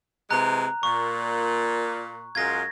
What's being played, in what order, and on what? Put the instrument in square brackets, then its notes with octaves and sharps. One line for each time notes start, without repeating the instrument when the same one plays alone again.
[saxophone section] C3 E3 G#3 [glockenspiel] A#5 F#6
[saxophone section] A#2 [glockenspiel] C#6
[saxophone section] F#2 G#3 F4 [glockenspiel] G#6 A#6